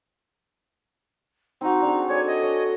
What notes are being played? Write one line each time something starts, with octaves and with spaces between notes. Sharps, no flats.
C4 D#4 F#4
D4 F#4 G#4
A4 C#5 D5 G#5
D#5
C#5